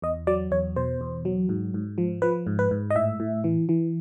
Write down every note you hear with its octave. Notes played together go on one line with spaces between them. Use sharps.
E2 D#5
F#3 D5
E2 C#5
B2 C5
E2
F#3
G#2
G#2
F3
F3 B4
G#2
B4
G#2
D#5
A2 E5
A2
E3
E3